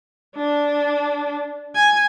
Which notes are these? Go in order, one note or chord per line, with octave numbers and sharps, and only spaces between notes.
D4
G#5